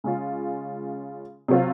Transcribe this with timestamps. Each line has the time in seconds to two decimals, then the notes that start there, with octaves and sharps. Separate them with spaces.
0.04 C#3 G#3 C#4 F4
1.48 C3 F#3 C4 F4